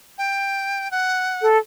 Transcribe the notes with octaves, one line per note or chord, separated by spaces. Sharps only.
G5
F#5
A4